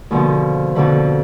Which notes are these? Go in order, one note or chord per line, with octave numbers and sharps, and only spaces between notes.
D#2 B2 D3 F3
F2 B2 D3 B4